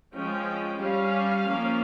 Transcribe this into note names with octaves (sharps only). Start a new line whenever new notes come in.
F3 G#3 C#4 G5
G3 C#4 F5
F3 A#3 C#4